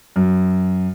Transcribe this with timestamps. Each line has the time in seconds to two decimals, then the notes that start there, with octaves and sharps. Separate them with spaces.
0.16 F#2